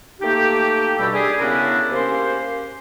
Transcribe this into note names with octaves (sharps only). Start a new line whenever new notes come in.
A3 A#3 D#4 G4
G2 B2 G3 A3 B5 E6
D4 G4 G#4
C#3 B3 C#4 D4 E4 A#4
A#3 C#4 G4 C5